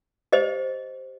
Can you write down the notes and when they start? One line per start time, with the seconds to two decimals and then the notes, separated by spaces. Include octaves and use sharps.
0.32 G4 C5 D#5